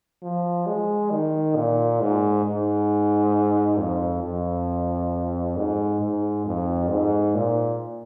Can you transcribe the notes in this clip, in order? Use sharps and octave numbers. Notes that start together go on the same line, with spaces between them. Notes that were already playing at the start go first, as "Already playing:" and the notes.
F3
G#3
D#3
A#2
G#2
G#2
F2
F2
G#2
G#2
F2
G#2
A#2